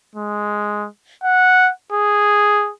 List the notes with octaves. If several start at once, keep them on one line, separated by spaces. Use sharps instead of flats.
G#3
F#5
G#4